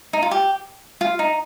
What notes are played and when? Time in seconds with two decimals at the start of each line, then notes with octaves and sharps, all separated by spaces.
0.13 D#4
0.22 F4
0.31 G4
1.01 F4
1.19 D#4